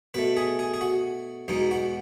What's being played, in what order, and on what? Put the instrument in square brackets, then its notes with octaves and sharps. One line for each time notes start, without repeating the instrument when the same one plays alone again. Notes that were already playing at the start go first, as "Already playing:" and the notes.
[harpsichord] B2 A3 B4
G#4
G#4
G#4
F#4
E2 B2 G#3 D#4
F#4